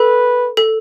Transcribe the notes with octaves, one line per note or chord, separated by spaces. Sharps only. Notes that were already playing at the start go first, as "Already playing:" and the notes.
Already playing: A4 B4
A4